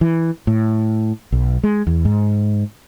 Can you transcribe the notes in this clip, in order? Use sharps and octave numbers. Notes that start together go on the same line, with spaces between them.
E3
A2
B1
G#3
E2
G#2